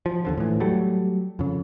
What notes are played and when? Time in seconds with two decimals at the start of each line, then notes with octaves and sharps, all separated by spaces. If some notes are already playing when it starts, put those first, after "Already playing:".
0.06 F3
0.25 D#2 D3 F3
0.38 A2 E3
0.60 F#3 G3 A3
1.39 F2 C#3